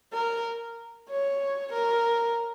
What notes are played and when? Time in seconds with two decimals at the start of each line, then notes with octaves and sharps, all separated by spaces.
0.13 A#4
1.09 C#5
1.73 A#4